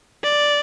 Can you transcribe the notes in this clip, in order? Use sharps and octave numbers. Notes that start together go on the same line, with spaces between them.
D5